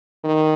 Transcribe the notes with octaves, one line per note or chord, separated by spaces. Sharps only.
D#3